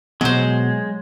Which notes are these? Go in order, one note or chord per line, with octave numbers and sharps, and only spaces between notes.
B2 F#3 G#3 B3 C5